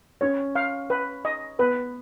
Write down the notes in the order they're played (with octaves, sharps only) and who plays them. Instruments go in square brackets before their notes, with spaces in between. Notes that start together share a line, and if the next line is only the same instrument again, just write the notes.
[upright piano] C#4 [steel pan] C#5
[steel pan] F5
B4
D#5
[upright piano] B3 [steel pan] B4